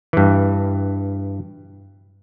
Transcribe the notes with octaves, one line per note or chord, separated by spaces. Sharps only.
G2 E3